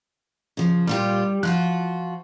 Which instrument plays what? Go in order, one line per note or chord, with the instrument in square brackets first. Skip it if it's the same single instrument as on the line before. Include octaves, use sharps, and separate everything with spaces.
[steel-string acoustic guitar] C#3 F3
[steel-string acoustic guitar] A#2 F4 G4 [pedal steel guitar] G3
[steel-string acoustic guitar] F3 F4 F#4 [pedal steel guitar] F#6